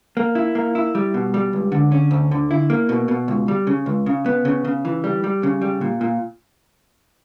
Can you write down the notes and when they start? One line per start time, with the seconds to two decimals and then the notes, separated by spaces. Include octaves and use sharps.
0.17 A#3
0.35 E4
0.55 A#3
0.75 E4
0.95 G3
1.14 B2
1.34 G3
1.53 C#2
1.72 D3
1.92 C#4
2.11 D2
2.31 D3
2.51 E4
2.70 A#3
2.89 B2
3.08 B2
3.28 C#2
3.48 G3
3.67 C#3
3.86 C#2
4.06 C#3
4.26 B3
4.45 C#3
4.65 C#3
4.85 E3
5.04 G3
5.24 G3
5.43 C#3
5.61 G3
5.81 A#2
6.01 A#2